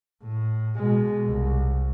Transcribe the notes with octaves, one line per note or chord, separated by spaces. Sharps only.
A2
B2 G#3
C2